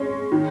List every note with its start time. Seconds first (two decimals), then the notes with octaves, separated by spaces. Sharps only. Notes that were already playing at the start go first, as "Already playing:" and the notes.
Already playing: G#3 C#4
0.32 D#3